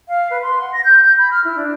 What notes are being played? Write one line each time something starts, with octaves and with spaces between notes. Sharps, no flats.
F5
B4
C6
F#5
A#6
G6
G6
B5
F6
E4
D4